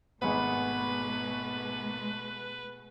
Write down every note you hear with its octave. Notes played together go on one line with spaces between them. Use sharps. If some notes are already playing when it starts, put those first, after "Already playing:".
G#1 B2 A3 B3 G#4 B4 F#5 B5